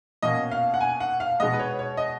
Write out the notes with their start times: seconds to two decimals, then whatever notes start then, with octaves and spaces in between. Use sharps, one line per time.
0.23 B2 A#3 C#4 D#5
0.52 F5
0.74 F#5
0.80 G#5
1.00 F#5
1.20 F5
1.40 B2 G#3 B3 D#5
1.53 B4
1.59 C#5
1.79 C#5
1.97 D#5